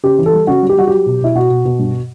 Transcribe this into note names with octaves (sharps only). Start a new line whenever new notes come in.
C#3 G4
E3
A4
G3
C#3 F#4
G3
G4
G3 F#4
F#3 G4
B2
B2 E4
B2 F#4
B2
B2
G2